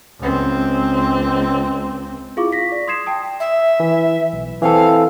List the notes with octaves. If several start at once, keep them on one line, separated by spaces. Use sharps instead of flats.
C#2 C4
E4 F4 G#4 F5 C#6 D6
A#6 B6
D5
C6 D#6 G#6 C7 E7
G5 A5 D#6
E5
E3
B1
E3 C4 A4 F5